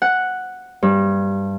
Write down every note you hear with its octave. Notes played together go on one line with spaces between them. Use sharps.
F#5
G2